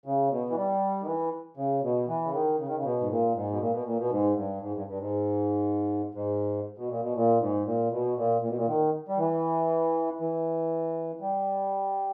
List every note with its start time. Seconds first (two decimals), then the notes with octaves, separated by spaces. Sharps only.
0.06 C#3
0.31 B2
0.51 E3
0.56 G3
1.02 D#3
1.06 E3
1.57 C#3
1.83 B2
2.08 E3
2.25 C#3
2.33 D#3
2.59 C#3
2.67 D#3
2.76 C#3
2.84 B2
3.00 G#2
3.10 A#2
3.35 G#2
3.52 B2
3.60 A#2
3.72 B2
3.86 A#2
3.99 B2
4.11 G#2
4.36 G2
4.61 G#2
4.75 G2
4.87 G2
4.99 G#2
6.14 G#2
6.78 B2
6.89 A#2
7.02 B2
7.16 A#2
7.40 G#2
7.65 A#2
7.91 B2
8.17 A#2
8.42 A#2
8.49 B2
8.56 A#2
8.67 D#3
9.08 G3
9.18 E3
10.20 E3
11.21 G3